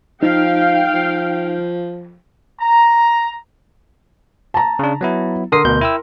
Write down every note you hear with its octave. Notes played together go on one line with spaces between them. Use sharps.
F3 D#4 F5 G5
F3
A#5
A5 A#5
C#3 D4
F#3 B3 E4
D3 A#4 C6 D#6 C7
D2 B2 G6
E4 G5 E6